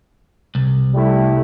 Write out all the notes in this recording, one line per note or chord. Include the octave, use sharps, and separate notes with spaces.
C2
G3 A3 E4